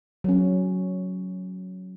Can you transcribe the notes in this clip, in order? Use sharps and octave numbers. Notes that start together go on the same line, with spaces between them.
F#3 C#4